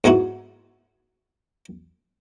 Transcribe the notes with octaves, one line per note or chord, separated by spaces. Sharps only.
G#2 B3 D#4 E4 F#4